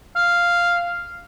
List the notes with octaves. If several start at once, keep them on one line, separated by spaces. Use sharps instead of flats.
F5